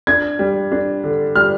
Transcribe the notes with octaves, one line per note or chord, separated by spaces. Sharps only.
D4 G#6
G3
D4
D3
G3 F6